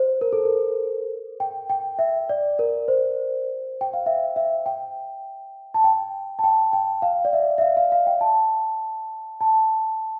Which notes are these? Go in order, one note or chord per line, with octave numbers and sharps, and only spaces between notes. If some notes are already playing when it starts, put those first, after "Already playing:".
Already playing: C5
A#4
A4
A#4
G5
G5
E5
D5
A#4
C5
G5
F5
E5
E5
G5
A5
G5
A5
G5
G5
F5
D5
E5
E5
F5
F5
F5
G5
A5
A5